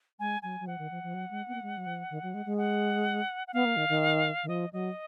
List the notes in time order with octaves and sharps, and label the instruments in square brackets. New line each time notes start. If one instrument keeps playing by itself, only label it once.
[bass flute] G#3 [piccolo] G#5
[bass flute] F#3 [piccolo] G#5
[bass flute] F#3
[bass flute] F3 [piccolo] F#5
[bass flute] D#3
F3
F3
F#3
G#3
B3
A#3
G#3
F#3
F3
D#3
F#3
G#3
G#3
[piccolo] F#5
F#5
[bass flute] B3 [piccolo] F5
[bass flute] A#3
D#3
D#3
D#3
[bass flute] F3 [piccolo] D#5
[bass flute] F#3 [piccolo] D#5